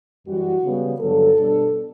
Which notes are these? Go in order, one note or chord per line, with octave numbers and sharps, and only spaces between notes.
F#2 E3 G3 F#4
C#3 G3 B3
G2 D3 F#3 A4
B2 G3 D4